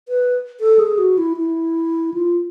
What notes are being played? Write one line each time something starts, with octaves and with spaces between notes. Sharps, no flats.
B4
A4
G#4
F#4
E4
E4
F4